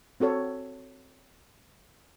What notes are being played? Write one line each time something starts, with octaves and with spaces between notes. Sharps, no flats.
C4 F#4 A4 C#5